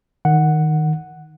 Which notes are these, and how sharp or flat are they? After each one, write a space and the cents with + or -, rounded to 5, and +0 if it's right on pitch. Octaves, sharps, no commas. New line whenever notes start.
D#3 +0 F#5 +0